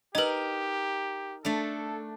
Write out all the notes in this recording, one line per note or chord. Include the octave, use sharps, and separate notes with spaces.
D#4 G4 A#4 B4 D#5
A3 D4 A4